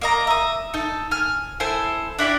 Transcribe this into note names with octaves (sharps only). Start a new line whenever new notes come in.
A#3 D#5 A#5
E5 D#6
D#4 A4
G#5 F6
E4 A4 C5 G#5
D4 E4 G4 D5